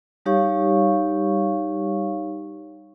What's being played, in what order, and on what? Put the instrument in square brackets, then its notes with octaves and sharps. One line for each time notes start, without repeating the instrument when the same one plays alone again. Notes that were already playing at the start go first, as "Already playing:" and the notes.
[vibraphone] G3 D#4 G4 C#5 F5 C#6